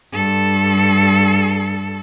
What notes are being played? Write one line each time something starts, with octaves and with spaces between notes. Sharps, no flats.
G2 A4